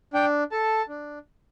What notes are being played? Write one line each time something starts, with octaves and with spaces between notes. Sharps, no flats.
D4 G5
A4 A5
D4